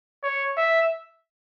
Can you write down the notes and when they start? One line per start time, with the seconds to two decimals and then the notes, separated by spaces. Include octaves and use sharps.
0.23 C#5
0.57 E5